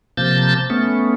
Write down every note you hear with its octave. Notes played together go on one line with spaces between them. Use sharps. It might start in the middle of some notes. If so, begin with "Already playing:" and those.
C3 F3 A#3 A5 G6 A6
A3 B3 C#4